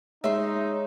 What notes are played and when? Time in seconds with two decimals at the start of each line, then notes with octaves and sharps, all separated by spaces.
0.24 G#3 D#4 C#5 E5 C6